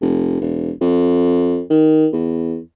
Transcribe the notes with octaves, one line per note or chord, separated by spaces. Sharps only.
F1
E1
F2
D#3
E2